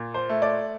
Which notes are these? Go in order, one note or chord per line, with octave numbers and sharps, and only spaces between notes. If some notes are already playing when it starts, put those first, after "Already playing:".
Already playing: A#2
C5
A3
D5